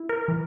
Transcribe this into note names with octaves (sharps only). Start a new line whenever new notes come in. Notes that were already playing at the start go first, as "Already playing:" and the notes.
Already playing: E4
A#4
E3